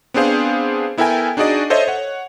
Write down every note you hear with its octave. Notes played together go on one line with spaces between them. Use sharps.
B3 C4 D4 G#4 C5 F5
B3 E4 A4 A#4 G5 G#5
D4 D#4 F#4 G#4 D5 D#5
A4 C5 C#5 D#5 E5
C#5 F#5